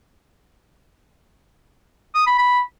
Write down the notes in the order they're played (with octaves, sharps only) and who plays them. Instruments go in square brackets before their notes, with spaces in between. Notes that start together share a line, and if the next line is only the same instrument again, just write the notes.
[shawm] D#6
B5
B5